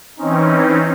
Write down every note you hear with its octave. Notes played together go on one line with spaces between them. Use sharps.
E3 C4 C#4 D#4